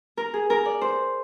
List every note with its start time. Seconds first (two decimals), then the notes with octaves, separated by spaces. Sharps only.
0.17 A#4
0.34 G#4
0.50 A#4
0.66 D5
0.81 C5